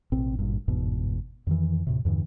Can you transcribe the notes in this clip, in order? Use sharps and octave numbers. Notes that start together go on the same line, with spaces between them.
A1 B2 C4
G#1 G2 A#2
G1 E2 G#2 B2
F2 D#3 E3
D#2 A2 C3
E2 G2 D3 E3